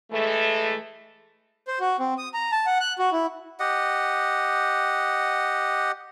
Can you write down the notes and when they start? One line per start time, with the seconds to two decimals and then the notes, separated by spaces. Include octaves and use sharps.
0.11 E3 G#3 A3
1.68 C5
1.80 F#4
1.99 C4
2.18 D#6
2.34 A#5
2.52 A5
2.66 F#5
2.80 F#6
2.99 F#4
3.12 E4
3.59 G4 D#5 F#5